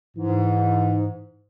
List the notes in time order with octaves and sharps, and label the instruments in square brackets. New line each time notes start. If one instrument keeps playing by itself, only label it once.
[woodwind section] G#2 [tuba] E3